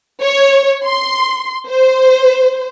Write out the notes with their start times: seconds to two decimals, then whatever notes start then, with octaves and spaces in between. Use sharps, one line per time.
0.23 C#5
0.85 C6
1.67 C5